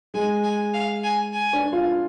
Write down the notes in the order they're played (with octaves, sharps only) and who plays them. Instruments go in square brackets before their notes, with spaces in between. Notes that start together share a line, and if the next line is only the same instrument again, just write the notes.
[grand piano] G#3 [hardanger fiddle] G#5
[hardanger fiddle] G#5
F5
G#5
G#5
[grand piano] D4
F4